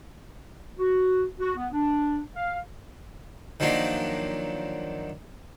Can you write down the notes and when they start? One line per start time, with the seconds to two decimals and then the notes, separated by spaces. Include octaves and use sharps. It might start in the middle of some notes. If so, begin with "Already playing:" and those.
0.79 F#4
1.39 F#4
1.56 B3
1.73 D4
2.35 F5
3.60 D#3 F3 F#3 A#3 D4